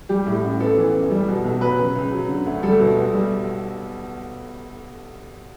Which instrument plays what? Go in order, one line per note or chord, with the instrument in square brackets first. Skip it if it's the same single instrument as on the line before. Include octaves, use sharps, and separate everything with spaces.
[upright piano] G3 G4
A2
A1
B3 A4
E3
F#2
G3
B2
B1
F#3 B4
C#3
C#2
F#3
D3
D2
G3 A4
B2
B1
G3